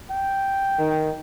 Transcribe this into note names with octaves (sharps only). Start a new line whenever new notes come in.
G5
D#3